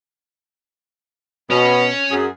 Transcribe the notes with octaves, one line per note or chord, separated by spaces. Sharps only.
B2 C#4
F#2 G#4